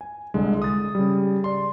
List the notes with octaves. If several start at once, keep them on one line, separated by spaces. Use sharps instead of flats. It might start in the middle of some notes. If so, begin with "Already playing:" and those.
G#5
C2 D3 G#3
D#6 A6
C#3 G3
D5 C6